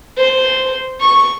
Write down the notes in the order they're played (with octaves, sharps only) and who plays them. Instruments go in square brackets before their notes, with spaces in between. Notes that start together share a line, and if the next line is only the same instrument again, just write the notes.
[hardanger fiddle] C5
C#6